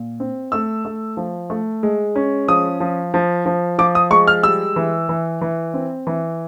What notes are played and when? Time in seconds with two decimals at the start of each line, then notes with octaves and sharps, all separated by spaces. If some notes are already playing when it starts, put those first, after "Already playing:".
Already playing: A#2
0.20 C4
0.52 A3 E6
0.85 A3
1.17 F3
1.50 A3
1.83 G#3
2.16 C#4
2.48 F3 D#6
2.80 F3
3.14 F3
3.46 F3
3.79 F3 D6
3.95 D#6
4.11 G#3 C#6
4.27 F6
4.43 G3 E6
4.76 E3
5.09 E3
5.41 E3
5.74 C4
6.07 E3